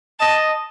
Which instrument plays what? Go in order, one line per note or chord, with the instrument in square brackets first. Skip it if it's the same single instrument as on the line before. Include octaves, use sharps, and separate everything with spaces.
[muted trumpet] D#5 [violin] A5